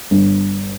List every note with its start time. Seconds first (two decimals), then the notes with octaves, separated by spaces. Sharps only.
0.11 G1